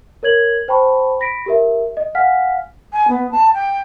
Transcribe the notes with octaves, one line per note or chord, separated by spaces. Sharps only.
A#4 C#5 G#6 F#7
C5 G5 A5 B5 C#6
B5 A#6 B6 D7
G4 A#4 E5
D#5
F5 F#5 G#5 F6 B6
G#5
B3
A5
G5